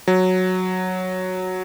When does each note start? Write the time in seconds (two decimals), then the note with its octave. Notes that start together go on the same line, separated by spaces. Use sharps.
0.07 F#3